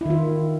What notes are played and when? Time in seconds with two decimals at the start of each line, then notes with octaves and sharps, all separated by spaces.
0.01 E4
0.06 D#3
0.10 F4